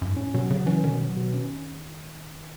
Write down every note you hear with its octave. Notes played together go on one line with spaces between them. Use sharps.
F#2
G#2
A2 C#4
B2 F#3
C#3 F#3
E3 C#4
B2 D#3
F#3
B2
C#4